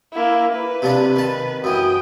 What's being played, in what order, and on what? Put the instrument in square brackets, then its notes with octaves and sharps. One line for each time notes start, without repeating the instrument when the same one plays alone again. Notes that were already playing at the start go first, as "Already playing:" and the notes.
[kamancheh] A#3 E4
B4
[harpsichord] C3 F3 D4
D#3 A5
[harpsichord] F#2 E3 [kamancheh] G5 D#6